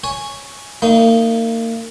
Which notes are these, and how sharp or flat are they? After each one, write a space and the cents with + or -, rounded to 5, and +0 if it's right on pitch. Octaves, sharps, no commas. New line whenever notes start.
C#5 +0 G#5 +0
A#3 -35 D#4 +0